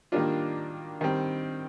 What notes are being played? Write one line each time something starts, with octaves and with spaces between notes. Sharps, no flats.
D#3 G3 A#3 D4 F4
D#3 G3 C4